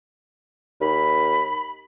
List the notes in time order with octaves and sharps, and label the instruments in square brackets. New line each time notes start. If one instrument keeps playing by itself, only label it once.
[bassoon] D#2 [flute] B5